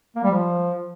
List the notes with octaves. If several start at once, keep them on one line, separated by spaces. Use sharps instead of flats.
A#3
G3
F3